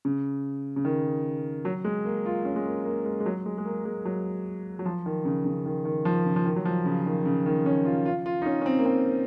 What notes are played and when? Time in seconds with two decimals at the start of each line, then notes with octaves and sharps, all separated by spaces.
0.05 C#3
0.76 C#3
0.85 D#3
1.65 F#3
1.84 G#3
2.05 A#3
2.26 F4
2.45 C#4
2.56 G#3
2.65 A#3
2.85 A#3
3.05 G#3
3.20 G#3
3.26 F#3
3.46 G#3
3.58 G#3
3.65 A#3
3.85 G#3
4.05 F#3
4.79 F#3
4.86 F3
5.06 D#3
5.25 C#3
5.45 C#3
5.66 D#3
5.85 D#3
6.05 F3
6.25 C#3
6.36 F3
6.45 D#3
6.56 F#3
6.65 F3
6.86 C#3
7.06 D#3
7.26 C#3
7.46 D#3
7.66 C#4
7.85 F4
8.06 F4
8.26 F4
8.42 D#4
8.46 C#4
8.61 C#4
8.66 C4
8.79 A#3
8.86 C4